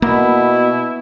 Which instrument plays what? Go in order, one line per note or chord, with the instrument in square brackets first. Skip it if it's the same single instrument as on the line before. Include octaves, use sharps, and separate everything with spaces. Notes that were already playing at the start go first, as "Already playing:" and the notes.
[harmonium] B2 [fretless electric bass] A#3 [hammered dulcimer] B3 E5 [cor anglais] E4